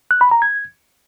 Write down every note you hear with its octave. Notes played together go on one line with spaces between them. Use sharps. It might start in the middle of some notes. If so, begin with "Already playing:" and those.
F#6
B5
A#5
G#6